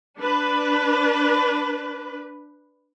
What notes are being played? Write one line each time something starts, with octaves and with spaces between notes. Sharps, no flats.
D4 B4